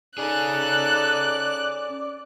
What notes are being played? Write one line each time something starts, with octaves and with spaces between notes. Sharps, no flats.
C#4 D#4 G#4 A4 D5 F#6